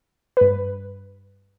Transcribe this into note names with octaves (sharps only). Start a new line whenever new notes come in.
G2 B4